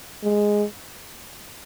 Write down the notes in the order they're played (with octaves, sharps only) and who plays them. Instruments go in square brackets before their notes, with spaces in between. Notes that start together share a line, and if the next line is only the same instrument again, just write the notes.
[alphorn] G#3